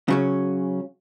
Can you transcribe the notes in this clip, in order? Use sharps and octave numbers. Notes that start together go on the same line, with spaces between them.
C#3 F#3 C#4